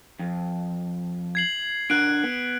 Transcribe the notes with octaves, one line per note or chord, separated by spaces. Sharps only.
F2
G#6 C7 F#7
D4 A#4 F#5 F#6 D7
B3